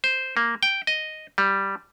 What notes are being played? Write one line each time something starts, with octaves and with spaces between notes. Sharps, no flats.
C5
A#3
G5
D#5
G3